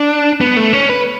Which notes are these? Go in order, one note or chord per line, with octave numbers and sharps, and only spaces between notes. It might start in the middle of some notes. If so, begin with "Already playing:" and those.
Already playing: D4
B3
A3
C#4
B4